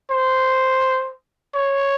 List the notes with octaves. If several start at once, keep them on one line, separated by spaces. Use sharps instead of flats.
C5
C#5